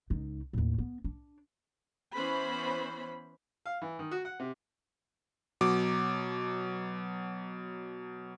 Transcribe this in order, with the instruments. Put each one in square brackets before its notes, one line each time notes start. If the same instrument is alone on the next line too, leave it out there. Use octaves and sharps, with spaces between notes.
[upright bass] C#2 D#4
D#2 A2
B3
D4
[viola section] E3 B3 C#4 C5 B5
[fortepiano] F5
E3
D#3
F#4
F#5
C3
[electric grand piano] B2 F#3 D6